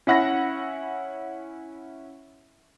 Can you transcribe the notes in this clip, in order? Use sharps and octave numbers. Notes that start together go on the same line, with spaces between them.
C#4 E4 F#5 B5 A#6